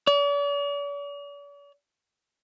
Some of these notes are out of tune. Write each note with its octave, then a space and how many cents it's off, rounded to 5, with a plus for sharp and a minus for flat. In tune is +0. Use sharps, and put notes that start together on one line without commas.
D5 -45